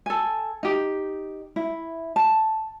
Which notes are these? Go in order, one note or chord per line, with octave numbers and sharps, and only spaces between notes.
A4 G#5
D#4 G4
E4
A5